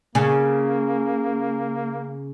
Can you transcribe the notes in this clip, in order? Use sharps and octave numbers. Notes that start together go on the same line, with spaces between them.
C#3 A#3